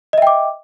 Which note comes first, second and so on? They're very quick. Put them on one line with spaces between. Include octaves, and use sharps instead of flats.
D#5 E5 G5 D6